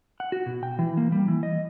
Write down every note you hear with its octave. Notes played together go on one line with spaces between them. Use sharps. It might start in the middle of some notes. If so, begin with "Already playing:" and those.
F#5
F#4
B2
G5
E3
A#3
G3
E3
D#5